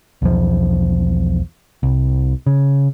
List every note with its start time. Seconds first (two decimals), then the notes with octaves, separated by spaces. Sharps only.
0.22 B1 E2 F3
1.83 C2
2.46 C#3